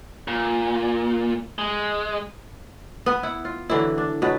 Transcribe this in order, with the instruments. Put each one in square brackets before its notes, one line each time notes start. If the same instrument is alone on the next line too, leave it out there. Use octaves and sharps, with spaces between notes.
[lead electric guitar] A#2
G#3
[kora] B3 B4
E4 F#5
F4
D3 E3 F#3 E4
D4
B2 F#3 B4